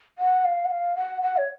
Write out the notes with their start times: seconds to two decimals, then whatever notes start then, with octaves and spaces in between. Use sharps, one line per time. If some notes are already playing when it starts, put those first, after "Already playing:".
0.18 F#5
0.45 F5
0.65 F#5
0.70 F5
0.96 F#5
1.22 F#5
1.37 C#5